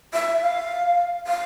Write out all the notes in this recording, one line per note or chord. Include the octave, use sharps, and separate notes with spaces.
E5
F5
F5